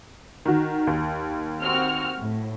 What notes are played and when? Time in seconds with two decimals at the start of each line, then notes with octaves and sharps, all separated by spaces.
0.45 D#3 F#4
0.87 D#2
1.62 C4 F#4 F6
2.21 A2